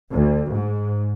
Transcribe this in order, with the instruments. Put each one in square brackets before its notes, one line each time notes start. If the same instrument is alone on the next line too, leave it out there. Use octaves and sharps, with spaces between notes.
[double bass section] D2
G#2